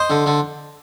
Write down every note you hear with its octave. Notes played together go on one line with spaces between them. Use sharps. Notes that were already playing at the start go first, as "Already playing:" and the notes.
Already playing: C5 D#5
D3
D3